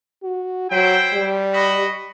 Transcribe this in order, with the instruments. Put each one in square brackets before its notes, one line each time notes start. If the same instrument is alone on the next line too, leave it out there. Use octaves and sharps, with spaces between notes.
[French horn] F#4
[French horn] F#3 [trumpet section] E4 C5 G5
[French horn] G3
[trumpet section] F#4 D#5 B5